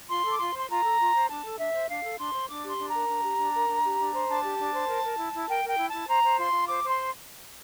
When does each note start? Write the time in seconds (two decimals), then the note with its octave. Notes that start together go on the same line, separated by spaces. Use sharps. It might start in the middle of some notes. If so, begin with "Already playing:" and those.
0.09 F4 C6
0.24 A4
0.30 D6
0.40 F4 C6
0.54 C5 C6
0.69 F4 A#5
0.84 A4
1.00 F4
1.14 C5
1.29 D4 A5
1.44 A4
1.59 D4 E5
1.74 C5
1.89 D4 F5
2.04 A4
2.19 D4 C6
2.34 C5
2.49 D4 D6
2.64 G4 C6
2.79 D4
2.89 A#5
2.94 A#4
3.08 D4
3.24 G4
3.39 D4
3.54 A#4
3.69 D4
3.83 G4
3.99 D4
4.13 C5
4.28 D4 A5
4.43 G4
4.59 D4
4.73 C5
4.88 A#4
5.03 A#4
5.18 E4
5.33 E4
5.48 A#4 G5
5.63 A#4
5.68 G5
5.78 E4
5.89 E4 A5
6.08 C5 A#5
6.23 C5
6.38 F4 C6
6.53 F4
6.68 C5 D6
6.83 C5 C6